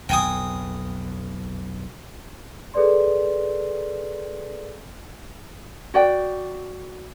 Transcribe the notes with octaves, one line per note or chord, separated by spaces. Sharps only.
B1 F2 G5 G#5 D#6
G#4 A4 B4 D5 C6
F#4 D5 G5